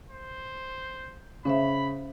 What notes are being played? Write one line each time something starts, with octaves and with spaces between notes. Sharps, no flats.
C5
C#3 C#4 C5 E5 B5